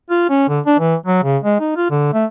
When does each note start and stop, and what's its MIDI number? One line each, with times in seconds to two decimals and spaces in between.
0.10 0.28 65
0.29 0.46 61
0.48 0.60 50
0.66 0.75 62
0.79 0.95 52
1.06 1.20 54
1.23 1.38 49
1.43 1.58 56
1.60 1.75 63
1.76 1.88 65
1.90 2.12 50
2.13 2.25 57